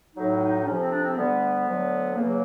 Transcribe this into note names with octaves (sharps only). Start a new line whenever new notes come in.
A2 F#3 D#4
D#4
D4
F2 C3 F3 C#4
C4
D4
C4
D2 D3 G3 B3
D2 D3 F#3
E2 C#3 F#3 A#3